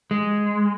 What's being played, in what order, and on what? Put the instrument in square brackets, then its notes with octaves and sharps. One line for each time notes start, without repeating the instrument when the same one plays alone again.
[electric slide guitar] G#3